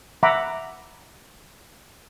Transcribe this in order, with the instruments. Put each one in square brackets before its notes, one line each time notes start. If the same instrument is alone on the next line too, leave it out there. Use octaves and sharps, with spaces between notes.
[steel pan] E5 F#5 A#5 B5 D6